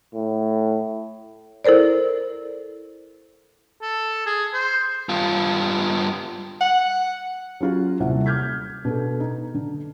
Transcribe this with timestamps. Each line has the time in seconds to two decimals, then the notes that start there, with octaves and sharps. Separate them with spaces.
0.14 A2
1.65 E4 A4 A#4 C5 D5
3.82 A4
4.27 G#4
4.53 C5
5.09 G2 F4
6.61 F#5
7.61 F#3 C#4 F4 F#4
8.00 D#1 C2 C3 F#5
8.26 D6 F6 G6 G#6 B6
8.85 B2 D4 A4
9.20 D#4
9.54 D3